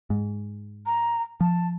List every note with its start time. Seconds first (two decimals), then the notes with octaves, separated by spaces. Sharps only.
0.10 G#2
0.86 A#5
1.41 F3 A5